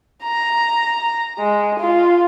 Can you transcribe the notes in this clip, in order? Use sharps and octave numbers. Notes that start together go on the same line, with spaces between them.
A#5
G#3
F4